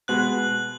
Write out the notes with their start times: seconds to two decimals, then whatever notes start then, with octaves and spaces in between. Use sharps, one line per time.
0.08 B2 G#3 B3 F#4 F#6 F#7